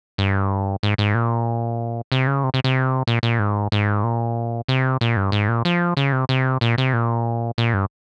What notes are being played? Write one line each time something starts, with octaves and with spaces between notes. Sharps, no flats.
G2
G#2
G#2
A#2
C3
C#3
C3
C3
C3
A#2
A#2
G#2
G#2
A#2
C3
A#2
G2
G#2
A#2
F3
C#3
C3
C3
A#2
C3
A#2
A#2
G2